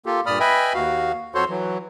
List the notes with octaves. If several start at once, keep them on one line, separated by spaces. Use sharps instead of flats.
A#3 F4 G4 A4
G2 A#2 D5 B5 D#6 F6
B4 D#5 E5 G5 G#5 B5
D#2 F#4 F5
F2 F#4 A4 C5 C#5 C6
E3 F#3